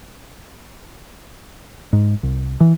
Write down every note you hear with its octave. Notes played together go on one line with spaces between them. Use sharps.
G#2
C2
E3